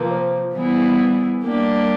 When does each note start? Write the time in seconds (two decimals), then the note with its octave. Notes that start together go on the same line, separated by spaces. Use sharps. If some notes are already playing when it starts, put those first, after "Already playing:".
Already playing: C3 F3 A#3 A#4 B4
0.11 C5
0.54 E3 G3 B3 E4 G#4
1.43 G3 A#3 D4 G4